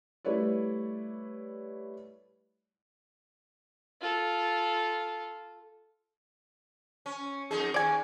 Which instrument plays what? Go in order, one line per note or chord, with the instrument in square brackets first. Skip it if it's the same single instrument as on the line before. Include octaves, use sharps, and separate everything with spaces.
[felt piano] G3 A3 E4 B4 C#5 D5
[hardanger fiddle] F4 A4
[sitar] C#4
F2 D#4 G#4
[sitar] D#2 [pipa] D5 G#5